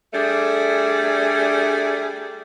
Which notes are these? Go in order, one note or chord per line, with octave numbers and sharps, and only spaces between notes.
G3 A3 D4 G#4